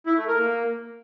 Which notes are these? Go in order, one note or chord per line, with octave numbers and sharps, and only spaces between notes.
E4
A3
A#4
A#3